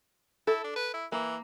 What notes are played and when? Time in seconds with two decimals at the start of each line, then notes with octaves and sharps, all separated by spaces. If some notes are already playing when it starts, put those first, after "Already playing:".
0.47 E4 A4
0.64 D4
0.76 B4
0.94 E4
1.12 E3 A#3